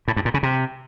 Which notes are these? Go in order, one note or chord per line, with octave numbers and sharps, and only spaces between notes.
A2
G2
A#2
C#3
C3